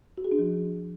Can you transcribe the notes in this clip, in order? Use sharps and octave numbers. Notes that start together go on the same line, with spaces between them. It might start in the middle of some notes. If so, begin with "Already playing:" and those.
F#4
G#4
D4
F3